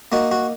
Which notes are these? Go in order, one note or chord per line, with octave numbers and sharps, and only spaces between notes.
A#3 D#4 F#4
F#4